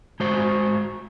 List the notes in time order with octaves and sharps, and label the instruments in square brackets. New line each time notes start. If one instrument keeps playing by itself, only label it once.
[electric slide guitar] G#3 F#4 C5